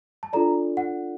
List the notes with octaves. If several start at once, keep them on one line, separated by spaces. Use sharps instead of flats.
A5
D4 F4 A4 D5 A#5
F#5